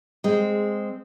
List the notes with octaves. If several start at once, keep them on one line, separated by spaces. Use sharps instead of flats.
G#3 C4